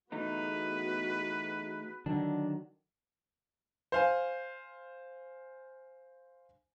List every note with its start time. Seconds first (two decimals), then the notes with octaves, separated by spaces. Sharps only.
0.12 E3 A3 B3 D#4 F#4 G#4 B4
2.06 D3 D#3 F#3 D4
3.92 C5 F5 G#5